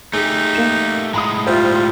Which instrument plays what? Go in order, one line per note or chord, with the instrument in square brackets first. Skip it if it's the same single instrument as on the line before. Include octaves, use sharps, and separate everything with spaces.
[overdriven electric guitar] A3 G4 [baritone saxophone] D#4 [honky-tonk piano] G#4
[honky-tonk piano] A#3 E7
[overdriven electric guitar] A2 G#3 [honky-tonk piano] A#5 B5 D#6
[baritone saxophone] G3 [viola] F4 [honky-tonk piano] C5 E5